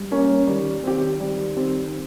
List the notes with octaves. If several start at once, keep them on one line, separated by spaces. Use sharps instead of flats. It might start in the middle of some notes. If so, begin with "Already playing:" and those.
Already playing: G3
A#3 C#4
D#3 G3
D#3 C4 G4
G3
C4 G4